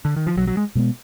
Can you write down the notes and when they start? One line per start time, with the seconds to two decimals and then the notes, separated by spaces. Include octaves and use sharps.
0.05 D3
0.16 D#3
0.27 F3
0.37 B1 F#3
0.47 F#3
0.57 G#3
0.75 B2 G#3 B3